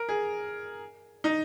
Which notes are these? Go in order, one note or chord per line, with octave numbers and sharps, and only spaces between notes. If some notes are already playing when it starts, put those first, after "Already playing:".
Already playing: A#4
G#4
D#4